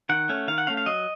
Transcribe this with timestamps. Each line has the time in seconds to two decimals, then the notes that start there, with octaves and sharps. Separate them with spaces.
0.09 D#3 F#5
0.29 A3 C#4
0.48 D#3 F5
0.58 F#5
0.67 A3 C#4 F5
0.77 F5
0.86 F#3 D#5